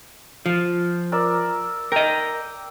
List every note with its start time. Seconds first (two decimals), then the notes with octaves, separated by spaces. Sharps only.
0.46 F3
1.12 A#4 D5 E5
1.92 A#4 D#5 G5